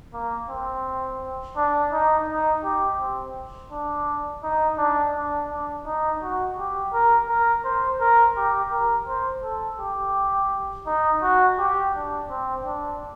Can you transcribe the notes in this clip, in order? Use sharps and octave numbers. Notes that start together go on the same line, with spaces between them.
A#3
C4
D4
D#4
D#4
G4
C4
D4
D#4
D4
D4
D4
D#4
F#4
G4
A#4
A#4
C5
A#4
G4
A#4
C5
A4
G4
D#4
F#4
G4
D4
C4
D4